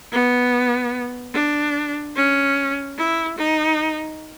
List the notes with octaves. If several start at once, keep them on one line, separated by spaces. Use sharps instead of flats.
B3
D4
C#4
E4
D#4